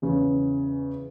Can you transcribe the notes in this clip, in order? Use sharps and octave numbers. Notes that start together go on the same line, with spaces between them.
E2 C#3